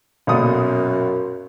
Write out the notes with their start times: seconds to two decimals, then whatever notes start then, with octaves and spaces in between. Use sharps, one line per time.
0.27 B1 F#2 A#2 D#6